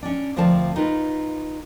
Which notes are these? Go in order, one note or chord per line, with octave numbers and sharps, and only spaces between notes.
C#4 D4
D2 F3 C4 A#4 D5 A5
D#4 F4 A#4 B4